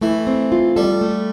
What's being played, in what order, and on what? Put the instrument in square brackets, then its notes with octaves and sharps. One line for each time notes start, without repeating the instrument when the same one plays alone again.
[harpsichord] E3 [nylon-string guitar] A3
[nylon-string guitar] C4
F4
[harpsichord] G3 [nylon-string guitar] A4
[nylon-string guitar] A3